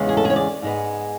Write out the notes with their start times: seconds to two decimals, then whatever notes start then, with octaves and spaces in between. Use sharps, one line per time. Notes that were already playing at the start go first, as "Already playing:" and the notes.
Already playing: E2 C#3 G#3 B3
0.09 G#4
0.17 A4
0.25 G#4 C#5
0.36 D5
0.62 G#2 G#3 B3